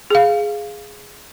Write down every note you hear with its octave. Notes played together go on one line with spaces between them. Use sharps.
G#4 F5